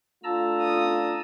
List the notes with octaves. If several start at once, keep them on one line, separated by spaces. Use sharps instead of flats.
A3 D4 F4 A5 A#5 E6
D#6